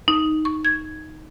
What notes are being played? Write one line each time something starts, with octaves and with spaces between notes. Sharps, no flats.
D#4
C#6
G#6